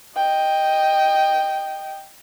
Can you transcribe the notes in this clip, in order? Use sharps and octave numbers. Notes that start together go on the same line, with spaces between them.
D#5 G5